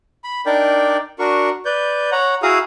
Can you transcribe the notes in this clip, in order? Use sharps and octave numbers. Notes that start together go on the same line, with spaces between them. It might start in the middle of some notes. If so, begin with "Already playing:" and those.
B5
D4 D#4 A#4 D5 G5 D6
D4 F#4 A#4 C#6
B4 D5 G6
C#5 F#5 A#5
E4 F#4 G#4 F5 A#5 D#6